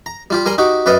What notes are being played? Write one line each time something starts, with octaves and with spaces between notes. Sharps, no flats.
A#5
G3 F4 G4
G3 A#4 G#5 A#5 C6
D#4 F#4 G4
F#2 B4 D5 D#5 F5